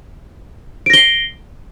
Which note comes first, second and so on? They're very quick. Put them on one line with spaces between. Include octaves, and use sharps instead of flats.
D7 A#6 G7 C7